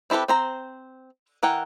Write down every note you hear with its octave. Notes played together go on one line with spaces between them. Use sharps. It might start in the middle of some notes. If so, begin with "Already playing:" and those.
C4 E4 G4 A4 B4
C4 C5 A#5
E3 A#4 F#5 G5